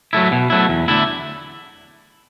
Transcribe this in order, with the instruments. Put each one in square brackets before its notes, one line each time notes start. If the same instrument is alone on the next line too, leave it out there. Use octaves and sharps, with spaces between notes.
[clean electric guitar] F#3 A3 E4
B2
F#3 A3 E4
E2
D3 A3 E4